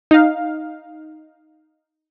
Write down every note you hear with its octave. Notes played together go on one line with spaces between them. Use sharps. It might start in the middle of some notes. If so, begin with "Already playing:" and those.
D#4 F5